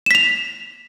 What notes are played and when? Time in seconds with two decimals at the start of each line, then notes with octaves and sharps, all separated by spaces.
0.06 E7
0.11 B6
0.15 F7